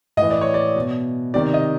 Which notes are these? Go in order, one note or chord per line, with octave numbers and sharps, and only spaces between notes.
A2 E3 D#5
D5
C#5
D5
B2
C3 D#3 D5
D#5